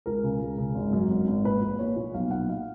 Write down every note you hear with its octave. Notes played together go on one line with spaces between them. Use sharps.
C#2 A#4
C#3
C#2
C#3
G#1
F#2
G#1
G#1
A#2 B4
A#1
A#1 C#5
A#2
B1 F5
B1 F#5
A#2 F5